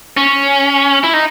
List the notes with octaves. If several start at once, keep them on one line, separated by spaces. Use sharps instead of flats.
C#4
E4
D#4